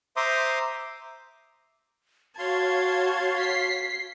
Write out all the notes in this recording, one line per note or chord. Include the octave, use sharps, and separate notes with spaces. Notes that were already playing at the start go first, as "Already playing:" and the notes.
C5 E5 A#5 C6 D6 D#6
F#4 C#5 F5 A5 C6 G#6
B6 C7